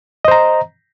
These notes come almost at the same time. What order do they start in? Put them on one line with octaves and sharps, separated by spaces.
D#5 C5 A#5